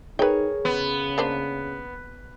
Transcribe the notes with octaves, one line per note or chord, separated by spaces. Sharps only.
D#4 G#4 A#4 B4 C#5 G5
C#3 B3
A#3 D4 C5